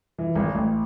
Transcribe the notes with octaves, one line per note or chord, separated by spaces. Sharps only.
E3
G#1
A1